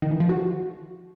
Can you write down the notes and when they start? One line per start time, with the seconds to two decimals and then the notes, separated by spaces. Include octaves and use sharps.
0.02 D#3
0.11 E3
0.20 F3
0.29 F#4